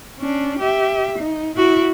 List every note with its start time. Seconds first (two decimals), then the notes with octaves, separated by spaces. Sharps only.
0.19 C#4 D4
0.59 G4 E5
1.19 D#4
1.56 E4 F#4